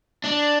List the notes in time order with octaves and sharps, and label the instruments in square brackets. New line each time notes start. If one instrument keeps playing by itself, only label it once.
[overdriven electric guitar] D4